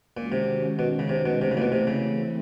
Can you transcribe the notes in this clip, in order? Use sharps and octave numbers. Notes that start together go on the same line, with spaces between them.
A#2 D#3 G#3 C#4 F#4
C3
B2
C#3
C3
B2
C3 E3 A3 C4 E4
C#3
A#2
B2
C3
C#3